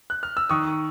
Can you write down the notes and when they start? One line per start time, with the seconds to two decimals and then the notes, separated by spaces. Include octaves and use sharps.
0.10 F#6
0.23 F6
0.37 E6
0.50 D#3 C#6 D#6